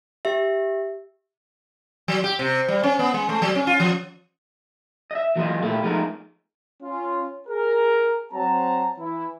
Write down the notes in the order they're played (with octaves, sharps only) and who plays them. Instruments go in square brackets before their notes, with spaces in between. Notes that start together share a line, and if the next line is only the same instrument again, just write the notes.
[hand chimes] G4 E5
[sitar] F#3
G4
C3
G3
C#4
B3
G#3
A3
F#3
C#4
F4
F3
[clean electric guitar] D#5 E5
E3 F#3 A#3 E4 F4 D#5
A#2 A3 A#3 E4 F#4 G4
F3 G#3 A3 B3 D#4 A#4
[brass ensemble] C#4 F4
G#4 A#4
F#3 C4 C5 A5 A#5
E3 E4